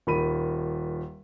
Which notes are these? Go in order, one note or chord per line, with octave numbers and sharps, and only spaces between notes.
D#1 D#3 B5 D#7